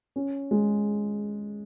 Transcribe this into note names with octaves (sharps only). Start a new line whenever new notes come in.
C#4
G#3